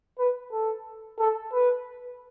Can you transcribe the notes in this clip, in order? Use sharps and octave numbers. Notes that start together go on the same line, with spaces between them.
B4
A4
A4
B4